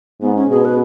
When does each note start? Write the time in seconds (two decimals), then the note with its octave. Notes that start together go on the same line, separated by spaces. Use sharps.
0.21 G#2 B3
0.36 C#4
0.50 B2 G#4
0.65 B4